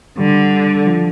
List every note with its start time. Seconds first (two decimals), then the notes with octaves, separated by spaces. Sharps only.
0.18 D3 G3
0.87 F3